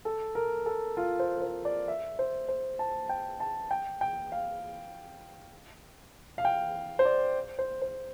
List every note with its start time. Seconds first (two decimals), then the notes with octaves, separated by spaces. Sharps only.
0.05 A4
0.35 A#4
0.66 A4
0.97 F4
1.19 C5
1.38 A#4
1.42 C5
1.65 D5
1.88 E5
2.19 C5
2.48 C5
2.79 A5
3.09 G5
3.40 A5
3.71 G5
4.01 G5
4.32 F5
6.38 F5
6.45 G5
6.99 C5
7.05 D5
7.59 C5
7.82 C5